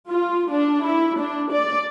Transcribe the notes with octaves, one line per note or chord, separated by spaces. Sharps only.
F4
D4
E4
D4
D5